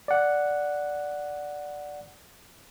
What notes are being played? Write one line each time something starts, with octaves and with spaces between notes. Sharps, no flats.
D5 F#5